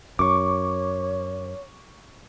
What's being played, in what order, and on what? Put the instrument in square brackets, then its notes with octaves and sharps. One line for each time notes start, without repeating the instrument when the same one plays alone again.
[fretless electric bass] F#2 [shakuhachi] C#5 [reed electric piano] C#6 D6